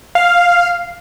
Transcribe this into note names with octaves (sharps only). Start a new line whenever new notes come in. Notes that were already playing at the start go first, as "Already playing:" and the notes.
F5